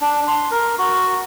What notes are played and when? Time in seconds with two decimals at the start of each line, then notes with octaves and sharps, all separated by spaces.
0.01 D4
0.28 C6
0.51 A#4
0.78 F#4